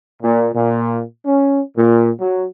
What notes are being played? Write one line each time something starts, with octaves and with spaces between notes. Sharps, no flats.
A#2
A#2
C#4
A#2
F#3